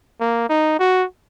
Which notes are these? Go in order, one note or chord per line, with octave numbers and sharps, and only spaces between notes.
A#3
D#4
F#4